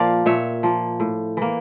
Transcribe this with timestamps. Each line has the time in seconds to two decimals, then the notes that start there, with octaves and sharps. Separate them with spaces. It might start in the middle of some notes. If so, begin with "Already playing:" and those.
Already playing: A#2 F3 A#3 D5 F5
0.26 A#2 C#5 E5
0.63 F3 A#3
1.00 A2
1.37 E3 A#3